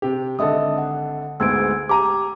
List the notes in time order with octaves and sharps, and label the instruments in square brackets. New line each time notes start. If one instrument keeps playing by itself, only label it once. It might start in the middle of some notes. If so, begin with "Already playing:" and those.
[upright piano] C3 G4
[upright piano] G#1 D3 A4 [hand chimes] D#5 E5 D#6
[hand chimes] F#5
[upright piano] D2 G#2 B3 [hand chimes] E6 G#6 D7
[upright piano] G4 A#5 D#7 [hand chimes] D6